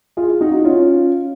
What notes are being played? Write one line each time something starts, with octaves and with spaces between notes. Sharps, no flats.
F4 G#4
D#4 F#4
D#4
C#4 F4